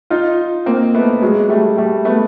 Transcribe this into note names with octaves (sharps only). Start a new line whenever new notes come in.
D#4 F4
A#3 C4
A3 B3
F#3 G#3
G3 A3
G3 A3
A3 B3